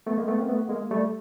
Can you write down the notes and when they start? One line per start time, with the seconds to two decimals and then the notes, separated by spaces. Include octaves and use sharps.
0.07 A3 B3
0.18 G#3 A#3
0.28 A3 B3
0.38 A#3 C4
0.48 A3 B3
0.69 G#3 A#3
0.91 G3 A3